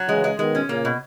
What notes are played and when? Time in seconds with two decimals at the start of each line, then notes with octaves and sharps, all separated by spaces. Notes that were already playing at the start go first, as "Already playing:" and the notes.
Already playing: F#3
0.08 C#3 E3 G#3
0.24 G#3
0.39 B2 D#3 G#3
0.55 C#4
0.69 A#2 C#3 A#3
0.85 B2